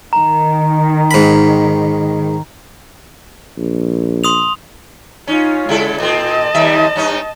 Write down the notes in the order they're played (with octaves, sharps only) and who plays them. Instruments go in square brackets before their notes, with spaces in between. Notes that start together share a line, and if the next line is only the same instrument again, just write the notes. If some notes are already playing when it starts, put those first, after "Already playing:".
[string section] D#3 [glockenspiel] A#5
[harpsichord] G#2 B5
[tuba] A#1
[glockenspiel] C6 D#6 F7
[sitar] C#4 [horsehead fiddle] D#4 F4
[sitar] C#3 E4 A4 [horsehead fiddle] G#3
[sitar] A#2 C4 [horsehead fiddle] D#5 A5
[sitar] D#2 G3 E5
G2 C#4 D#4